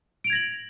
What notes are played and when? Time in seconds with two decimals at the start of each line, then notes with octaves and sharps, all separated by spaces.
0.24 D7
0.27 F7
0.30 G#6
0.33 A#6
0.35 F#7